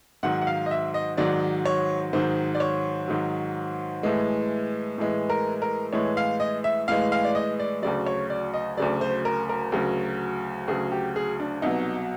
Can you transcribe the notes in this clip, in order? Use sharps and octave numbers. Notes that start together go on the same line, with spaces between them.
G#2 D#3 F#3 F#5
F#5
F5
D#5
E5
D#5
G#2 D#3 F#3 D5
C#5
G#2 D#3 F#3 C5
D5
C#5
G#2 D#3 F#3
A2 E3 G#3
A2 E3 G#3
A#4
A#4
A2 E3 G#3 C#5
F5
D#5
E5
A2 E3 G#3 F5
F5
D5
D#5
D5
D2 C#3 F#3 D5
C#5
D5
D#5
D2 C#3 F#3 D5
C5
A#4
A#4
D2 C#3 F#3
D2 C#3 F#3 G#4
G4
G#4
D4
C2 B2 F#3 D#4